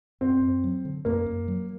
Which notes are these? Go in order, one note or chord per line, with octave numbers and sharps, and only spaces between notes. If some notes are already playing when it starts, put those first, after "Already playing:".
F#2 C4
F#2
F#3
D3
F#2 A#3
F#2
F#3